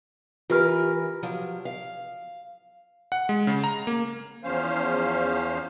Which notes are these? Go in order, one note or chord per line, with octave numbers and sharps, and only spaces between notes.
E3 F4 G4 A#4 B4 F6
F3 F#3
F5
F#5
G#3
C#3
A#5
A#3
E2 F3 C#4 C5 F5